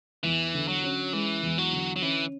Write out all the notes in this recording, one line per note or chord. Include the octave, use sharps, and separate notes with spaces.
E2 E3
D3
F#3
C#4
E3 G#3
E2
F#3
D3
F#3
E3 C#4